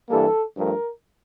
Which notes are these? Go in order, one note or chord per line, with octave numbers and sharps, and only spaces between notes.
G2 E3 G3 A#3 A4
G2 F3 A3 A#4